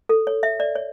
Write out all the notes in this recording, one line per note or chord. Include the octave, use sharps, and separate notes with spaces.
A4
C#5
E5
D5
C#5